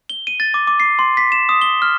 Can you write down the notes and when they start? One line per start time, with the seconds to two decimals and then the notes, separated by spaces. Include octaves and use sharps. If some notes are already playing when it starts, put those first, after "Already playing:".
0.10 G7
0.27 D#7
0.40 A6
0.54 D6
0.67 D6
0.80 C7
0.99 C6
1.17 B6
1.32 E7
1.49 D#6
1.62 G7
1.82 F6